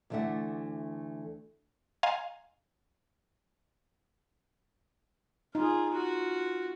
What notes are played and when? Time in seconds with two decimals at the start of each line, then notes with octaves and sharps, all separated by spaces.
0.10 D2 E3 A3 D4 E5 F#5
2.03 D#5 F5 G#5 A#5 C6 G#6
5.55 D#4 F4 G#4
5.90 F4 F#4